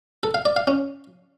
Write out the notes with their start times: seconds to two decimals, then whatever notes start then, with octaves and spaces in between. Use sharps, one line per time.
0.23 A4
0.34 F5
0.45 D5
0.56 F5
0.67 C#4